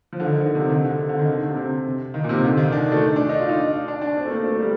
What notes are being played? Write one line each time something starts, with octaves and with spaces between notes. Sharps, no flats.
F3
D3
D#3
D3
C3
D#3
D3
C3
D3
D#3
D3
C3
C3
D#3
A#2
C3
D3
D#3
D4
A3
D4
D#4
F4
D#4
D4
D4
D4
C4
A3
A#3
A3
G3